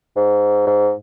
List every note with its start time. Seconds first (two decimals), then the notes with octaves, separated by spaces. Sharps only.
0.16 G#2
0.67 G#2